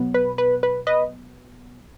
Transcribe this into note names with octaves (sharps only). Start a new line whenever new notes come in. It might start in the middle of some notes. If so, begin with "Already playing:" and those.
Already playing: B2 F#3 B3
B4
B4
B4
B4 D#5